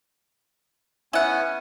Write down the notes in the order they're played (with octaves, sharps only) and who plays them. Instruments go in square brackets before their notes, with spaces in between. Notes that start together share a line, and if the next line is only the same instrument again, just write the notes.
[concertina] B3 C#4 G#5 [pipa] E4 F#5